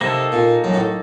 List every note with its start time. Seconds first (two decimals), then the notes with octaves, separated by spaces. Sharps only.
0.01 C3 A#3 D#4 A4
0.32 A#2
0.64 F#2
0.74 A2